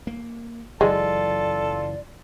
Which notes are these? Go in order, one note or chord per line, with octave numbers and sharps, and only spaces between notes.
A#3
F#1 E3 F#3 G#3 F4 A4 D5